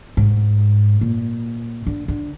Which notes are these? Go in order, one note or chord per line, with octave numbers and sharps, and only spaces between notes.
G#2
A#2
D3
D3